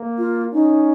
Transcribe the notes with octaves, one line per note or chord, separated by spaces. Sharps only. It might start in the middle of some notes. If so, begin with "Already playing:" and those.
Already playing: A#3
F4
C#4 D#4